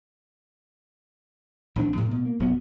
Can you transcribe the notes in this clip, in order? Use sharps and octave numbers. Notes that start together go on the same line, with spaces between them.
A#1 E3 C4 D4
A2 C3 F3
B2
A#3
F1 B2 F#3 B3